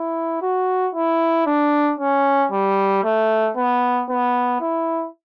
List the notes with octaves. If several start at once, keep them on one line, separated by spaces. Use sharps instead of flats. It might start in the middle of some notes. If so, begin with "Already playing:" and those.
Already playing: E4
F#4
E4
D4
C#4
G3
A3
B3
B3
E4